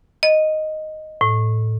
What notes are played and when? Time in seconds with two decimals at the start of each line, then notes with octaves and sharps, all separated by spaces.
0.23 D#5
1.21 A2